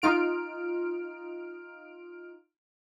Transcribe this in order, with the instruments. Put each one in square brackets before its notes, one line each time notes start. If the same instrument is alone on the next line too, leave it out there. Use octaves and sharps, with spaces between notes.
[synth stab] D#4 F4 F6 D7